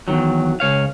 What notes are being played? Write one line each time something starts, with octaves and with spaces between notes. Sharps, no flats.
E2 G#2 D#3 F#3
C#2 C#5 F5